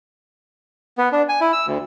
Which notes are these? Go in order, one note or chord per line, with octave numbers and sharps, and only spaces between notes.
B3
D4
G#5
E4
E6
D2